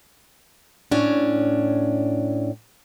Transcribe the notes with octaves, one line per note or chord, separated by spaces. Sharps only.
A2 C#4 D4